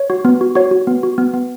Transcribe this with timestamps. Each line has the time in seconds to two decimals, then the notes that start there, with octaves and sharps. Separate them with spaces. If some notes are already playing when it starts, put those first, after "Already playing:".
Already playing: C#5
0.10 F#4
0.25 B3
0.41 F#4
0.55 F#4 C#5
0.71 F#4
0.87 B3
1.03 F#4
1.18 B3
1.34 B3